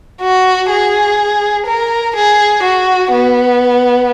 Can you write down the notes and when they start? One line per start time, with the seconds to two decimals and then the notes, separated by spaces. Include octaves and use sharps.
0.21 F#4
0.70 G#4
1.66 A#4
2.16 G#4
2.63 F#4
3.12 B3